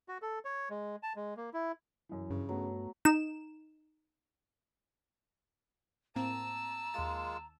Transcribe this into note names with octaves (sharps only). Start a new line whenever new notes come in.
F#4
A4
C#5
G#3
A5
G#3
A#3
E4
F#2 E3
G2 C#3
F#3 A3 B3
D#4 E7
A2 A#3 C4 A5 A#5 E6
D#2 G#3 A#3 F4 A6